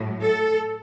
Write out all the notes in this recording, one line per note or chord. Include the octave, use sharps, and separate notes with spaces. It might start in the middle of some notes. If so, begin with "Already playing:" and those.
Already playing: A2 F#3
A4